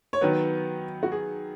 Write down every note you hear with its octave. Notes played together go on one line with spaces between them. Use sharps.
C#5
D#3 F#3 B3 B4
F#4
G#4